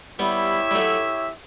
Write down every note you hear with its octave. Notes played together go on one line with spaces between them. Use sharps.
G3 B3 E4 G4 C#5 E5
G3
F#3 A3